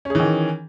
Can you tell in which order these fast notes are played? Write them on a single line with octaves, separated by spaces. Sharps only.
C#4 G#4 E3 D#3